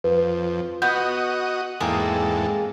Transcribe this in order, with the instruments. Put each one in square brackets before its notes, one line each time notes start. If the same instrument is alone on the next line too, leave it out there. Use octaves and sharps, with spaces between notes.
[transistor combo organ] F2 [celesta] B4
[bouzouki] B3 [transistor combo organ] F#4 D#5 [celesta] G6
[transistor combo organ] E2 G#2 A4 [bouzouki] G#3 A#3 C4